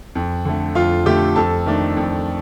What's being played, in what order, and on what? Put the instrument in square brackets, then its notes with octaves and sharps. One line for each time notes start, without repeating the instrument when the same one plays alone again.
[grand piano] F2
D3 A3
F2 F4 F5
D3 A3 G4 G5
F2 A4 A5
D#3 A3 D4
F2